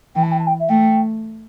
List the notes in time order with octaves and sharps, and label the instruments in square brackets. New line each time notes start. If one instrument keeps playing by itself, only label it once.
[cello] E3 [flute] G5
[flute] A5
G5
A5
G5
E5
[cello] A3 [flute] G5